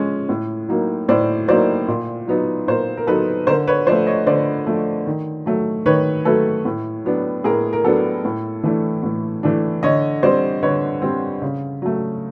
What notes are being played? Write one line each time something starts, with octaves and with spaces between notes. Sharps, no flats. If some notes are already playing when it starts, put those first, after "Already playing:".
Already playing: F3 G#3 C#4
A2
F#3 A#3 D#4
A2 C5 D5
F#3 A#3 D#4 C5 D5
A#2
F#3 B3 D#4
A#2 A#4 C5
A#4
F#3 B3 D#4 A4 B4
D3 A#4 C5
B4 C#5
F3 A3 C5 D5
C#5 D#5
D3 C5 D5
F3 A3
D#3
F#3 A3
D#3 B4 C#5
F#3 A3 A4 B4
A2
F#3 B3 D4
A2 G#4 A#4
A#4
F#3 B3 D4 A4
A2
E3 A3 D4
A2
E3 A3 D4
D3 C#5 D#5
G3 C4 C5 D5
D3 B4 C#5
G3 C4
C#3
F#3 A3